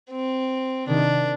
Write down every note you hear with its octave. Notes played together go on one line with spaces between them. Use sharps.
C4
C3 D#3 D4